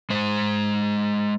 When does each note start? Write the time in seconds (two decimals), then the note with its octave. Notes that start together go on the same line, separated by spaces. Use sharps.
0.10 G#3 C5